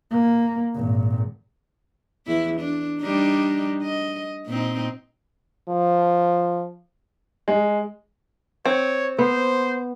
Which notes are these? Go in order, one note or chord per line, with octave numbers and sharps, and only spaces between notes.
A#3
G#1 A#2
E2 E4
D4
G3 D4 D#4
D#5
A#2 C4 D#4
F3
G#3
C4 C#5
B3 C5